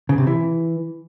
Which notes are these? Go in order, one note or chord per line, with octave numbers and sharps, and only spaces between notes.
C#3
C3
E3